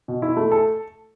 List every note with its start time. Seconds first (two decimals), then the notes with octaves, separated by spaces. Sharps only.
0.08 B2
0.22 E4
0.37 A3
0.52 A4